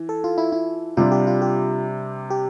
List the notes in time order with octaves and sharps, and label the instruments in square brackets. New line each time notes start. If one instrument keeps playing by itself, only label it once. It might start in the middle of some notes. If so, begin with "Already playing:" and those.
Already playing: [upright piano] E3
[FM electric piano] A4
F4
E4
E4
[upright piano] C3 G3 D4 [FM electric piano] F4
[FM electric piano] G4
F4
G4
G4